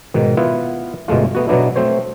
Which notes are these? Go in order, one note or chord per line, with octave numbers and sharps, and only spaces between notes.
G#2 B2 D#3
B3 E4 F4 E5 F#5
G1 B2 G#3 A3 F4
A3 B3 F#4
B2 F#3 B3 D4 E4
A3 C4 C5 C#5